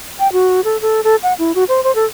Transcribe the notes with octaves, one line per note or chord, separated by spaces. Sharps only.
G5
F#4
A4
A4
A4
F#5
E4
F#4
C5
C5
A4